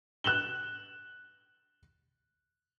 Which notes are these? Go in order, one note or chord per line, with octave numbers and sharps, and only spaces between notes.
F#6 E7 F#7 G7